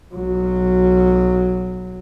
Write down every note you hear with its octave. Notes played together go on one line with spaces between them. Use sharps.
B1 F#3